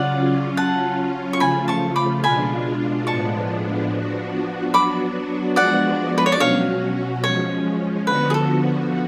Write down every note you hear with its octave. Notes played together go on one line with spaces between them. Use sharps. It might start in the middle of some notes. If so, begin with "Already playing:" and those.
Already playing: C#3 F#3 C#4 F4 D5 F#5
F#3 C#4 F4 F#5 A5
C#6
C#3 F3 A3 F4 G#5 B5
A5 C#6
B5 D6
B2 G#3 D4 F4 G#5 B5
A2 F3 G#3 B3 D4 A5 C#6
F3 B3 D4 F#4
F#3 B3 D4 F#4 B5 D6
F3 G#3 B3 D4 F#4 D5 F#5
B4
C#5
D5
B2 F#3 C#4 F#4 C#5 F5
F3 G#3 C#4 C#5
D3 F3 B3 F#4 B4
G#4
A4